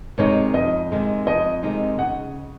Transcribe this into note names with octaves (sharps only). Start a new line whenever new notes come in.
C3 D#3 G#3 D#4 C#5
F2 D#5
C3 D#3 G#3 D#4
F2 D#5
C3 D#3 G#3 D#4
C#3 F#5